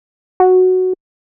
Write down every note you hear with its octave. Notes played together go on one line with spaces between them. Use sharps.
F#4